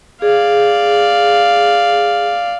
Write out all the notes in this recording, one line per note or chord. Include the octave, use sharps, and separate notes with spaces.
G#4 D5 F5